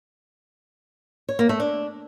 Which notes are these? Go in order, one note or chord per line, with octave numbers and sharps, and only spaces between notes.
C#5
A#3
A3
D4